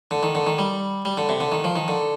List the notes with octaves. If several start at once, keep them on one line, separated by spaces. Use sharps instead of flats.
D3
D#3
D3
D#3
G3
G3
D3
C3
D3
D#3
F3
D#3
D3